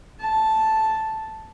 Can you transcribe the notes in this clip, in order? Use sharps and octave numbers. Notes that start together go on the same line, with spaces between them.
A5